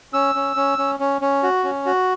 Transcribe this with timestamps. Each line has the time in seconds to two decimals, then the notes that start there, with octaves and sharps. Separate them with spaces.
0.13 C#4 E6
0.35 C#4
0.56 C#4
0.78 C#4
1.00 C#4
1.21 C#4
1.43 F#4
1.64 C#4
1.86 F#4